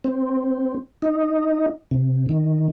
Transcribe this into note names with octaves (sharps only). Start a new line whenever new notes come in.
C4
D#4
C3
D#3